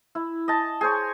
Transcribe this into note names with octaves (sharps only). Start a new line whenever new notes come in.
E4
D#5 A5
G#4 C5 C#5